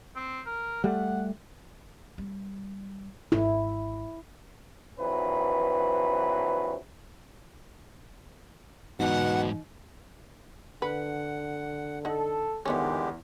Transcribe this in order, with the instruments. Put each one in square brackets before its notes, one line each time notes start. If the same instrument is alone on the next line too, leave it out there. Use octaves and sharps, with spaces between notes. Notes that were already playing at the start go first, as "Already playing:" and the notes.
[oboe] C4
A#4
[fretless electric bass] G3 A3 [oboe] F#5
[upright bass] G3
[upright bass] G#1 [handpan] E4
[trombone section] A#1 E3 F#3 C4 B4
[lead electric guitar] E2 G#2 [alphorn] B2 [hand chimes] D#4 [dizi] F#5
[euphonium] D3 [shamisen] B4 [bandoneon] F#5
[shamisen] D#4 F#5 [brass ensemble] A4
[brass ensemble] E2 [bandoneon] D3 G#3 G4 [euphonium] D#3 [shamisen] F3 B3 C#4